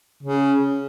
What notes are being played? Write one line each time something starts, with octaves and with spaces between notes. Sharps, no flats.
C#3